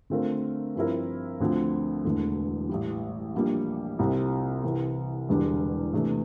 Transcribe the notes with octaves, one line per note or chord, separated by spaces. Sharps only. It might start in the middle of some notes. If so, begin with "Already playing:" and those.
D3 A3 C4 F4 A#4
G2 F3 C4 E4 A#4
D2 D3 F3 C4
E1 E2 D3 A3
A1 A2 G3
A#1 A#2 G3 A#3 D4
C2 C3 G3 C4
C2 C3 E3
E1 E2 D3 G3 D4
E2 C3 E3 A3 D4